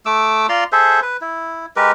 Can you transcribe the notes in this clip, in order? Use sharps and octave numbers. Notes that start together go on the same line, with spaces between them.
A3 D6 E6
F4 D5 A#5 C6
G#4 A4 C5 E5
B4
E4
G#3 G4 A#4 B4